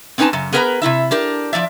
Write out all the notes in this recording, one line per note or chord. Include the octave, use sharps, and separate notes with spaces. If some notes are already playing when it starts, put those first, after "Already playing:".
C4 C#4 D#4 B4 G#5 A5
F#2 C#3
B3 G#4 A#4 B4 E5 A#5
C3 F3 E4 E5
D4 G4 A#4
F3 G#3 D5 E5